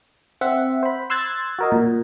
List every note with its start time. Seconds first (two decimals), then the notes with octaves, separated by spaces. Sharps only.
0.41 C4 E5 F#5
0.83 C5 B5
1.10 C6 E6 F#6 G#6 A6
1.59 F#4 A#4 D#5
1.72 A#2